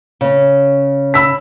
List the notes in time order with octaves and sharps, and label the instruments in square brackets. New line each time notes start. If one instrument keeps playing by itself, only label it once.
[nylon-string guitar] C#3 C#4
[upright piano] B5 E6 B6